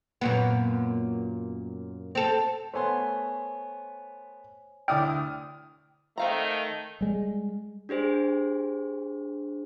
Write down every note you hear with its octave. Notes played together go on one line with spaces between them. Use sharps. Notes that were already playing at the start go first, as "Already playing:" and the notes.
F#2 A#2 B3
C4 A4
A3 B3 C5 C#5 G#5 C6
D2 E4 D5 G5 D6 D#6 F6
D#3 A3 C4 F5 A#5
G3 G#3
D4 G4 G#4 C5